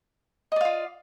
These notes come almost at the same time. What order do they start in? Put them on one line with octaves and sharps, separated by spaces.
D#5 D5 F5 F4